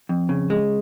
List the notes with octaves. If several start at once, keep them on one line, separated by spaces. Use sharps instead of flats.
F2
C#3
G#3